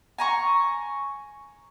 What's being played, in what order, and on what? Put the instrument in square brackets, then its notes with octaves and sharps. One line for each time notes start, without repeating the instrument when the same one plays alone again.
[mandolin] G#5 A#5 C#6